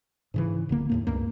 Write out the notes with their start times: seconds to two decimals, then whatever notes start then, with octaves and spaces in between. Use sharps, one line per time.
0.34 G#2 C#3 E3
0.69 D1 D3 A#3
0.90 D#2 A2 A#3
1.07 C#2 G2 A#3